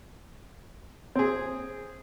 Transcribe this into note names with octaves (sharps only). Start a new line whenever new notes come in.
C4 G#4